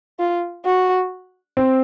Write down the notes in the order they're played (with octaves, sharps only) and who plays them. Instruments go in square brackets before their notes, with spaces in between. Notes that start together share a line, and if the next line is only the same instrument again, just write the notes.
[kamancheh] F4
F#4
[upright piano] C4